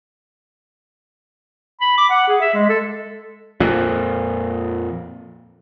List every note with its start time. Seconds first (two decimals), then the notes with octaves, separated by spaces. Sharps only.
1.81 B5
1.98 D6
2.10 F#5
2.28 G#4
2.41 E5
2.54 G#3
2.69 A4
3.60 F2 A#2